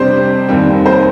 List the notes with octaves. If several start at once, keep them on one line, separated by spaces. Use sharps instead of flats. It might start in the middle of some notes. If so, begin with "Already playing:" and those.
Already playing: F2 C3 G3 D4 C5
F1 D#2 D#3 G3 C4
C5